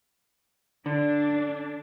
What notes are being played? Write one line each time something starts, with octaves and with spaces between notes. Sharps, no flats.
D3 D4